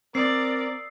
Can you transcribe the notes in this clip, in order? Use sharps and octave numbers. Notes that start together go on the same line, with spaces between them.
C4 A#4 D5 D#6 E6 C7